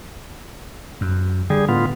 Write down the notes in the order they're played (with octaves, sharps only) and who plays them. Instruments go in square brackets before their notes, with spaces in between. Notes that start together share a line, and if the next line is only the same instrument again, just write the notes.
[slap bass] F#2
[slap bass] D3 [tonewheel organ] G3 G#4
[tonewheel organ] A2 B3 F4